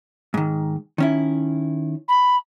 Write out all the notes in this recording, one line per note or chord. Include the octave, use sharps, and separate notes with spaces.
G#2 D#3
D#3 C#4 E4
B5